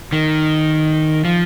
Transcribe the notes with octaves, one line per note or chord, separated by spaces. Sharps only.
D#3
F3